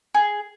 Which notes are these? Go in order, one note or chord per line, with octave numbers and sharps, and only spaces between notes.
G#4